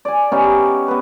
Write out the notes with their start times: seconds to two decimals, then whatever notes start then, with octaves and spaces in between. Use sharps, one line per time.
0.05 D5 G#5
0.32 B3 C#4 D#4 G4
0.88 B3 B4